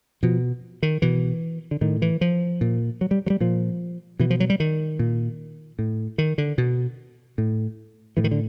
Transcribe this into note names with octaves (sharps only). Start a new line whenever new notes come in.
B2 F3
D#3
B2 E3
D3
A2 D#3
E3
F3
A#2
F#3
G3
F#3
G3
A#2 F3
B2 E3
F3
F#3
G3
D#3
A#2
A2
D#3
D3
B2
A2
A2 E3
D#3
D3